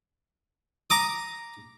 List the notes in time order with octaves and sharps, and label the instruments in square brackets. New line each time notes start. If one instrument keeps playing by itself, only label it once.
[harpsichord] A#5 D6 D#6